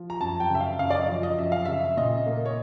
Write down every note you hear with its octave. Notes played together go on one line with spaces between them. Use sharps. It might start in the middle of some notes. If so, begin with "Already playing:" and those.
Already playing: F3
A#5
F#2 A5
G5
C#3 E5
F5
F#2 F5
D5
D#5
F3
D#5
F#2 E5
F5
C#3 E5
A#2 D#5
A#3
C#5